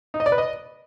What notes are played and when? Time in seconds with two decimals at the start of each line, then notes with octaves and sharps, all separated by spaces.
0.14 D#4
0.20 D#5
0.26 D5
0.32 B4
0.38 D#5